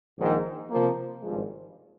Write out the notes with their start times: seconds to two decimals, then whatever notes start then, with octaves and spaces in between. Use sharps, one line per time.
0.18 A#1 G#2 D#3
0.70 C3 F3 A#3
1.22 G#1 G2 F3 G#3